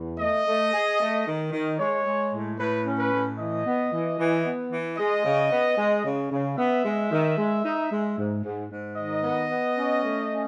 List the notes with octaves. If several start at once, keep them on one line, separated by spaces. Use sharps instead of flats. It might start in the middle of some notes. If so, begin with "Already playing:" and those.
Already playing: E2
A3 D#5
A3
G#4
A3
D#3
D#3
G#3 C#5
G#3
A2
A2 B4
C#4
B4
A2
E3 D#5
B3
E3
E3
B3
E3
G#3 D#5
C#3
B3
G#3
C#3
C#3
B3 E5
G#3
D#3
G#3
D#4
G#3
G#2
G#2
G#2
D#3 D#5
B3
B3
C#4
A3
C#4